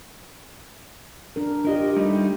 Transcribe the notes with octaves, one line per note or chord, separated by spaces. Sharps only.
D4 A#4
D4 F4 G4 A#4 D#5
G3 A3 D#4